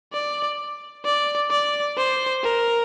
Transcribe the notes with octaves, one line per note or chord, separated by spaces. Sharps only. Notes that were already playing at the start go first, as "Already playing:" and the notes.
D5
D5
D5
C5
A#4